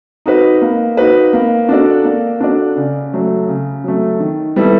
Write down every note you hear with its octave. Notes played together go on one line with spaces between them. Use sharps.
D#4 F#4 B4
A#3
D#4 F#4 B4
A#3
D4 F#4 A4 D5
A#3
D4 F#4 A4 D5
C#3
F#3 A3
C#3
F#3 A3
D#3
G3 B3 E4 A4